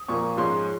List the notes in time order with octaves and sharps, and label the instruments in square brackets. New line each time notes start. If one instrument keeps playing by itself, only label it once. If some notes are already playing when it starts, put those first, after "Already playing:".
Already playing: [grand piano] D#6
[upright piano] A#2 F3 A#3 [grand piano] C#6
[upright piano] G#2 F3 G#3 C#4 [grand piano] C6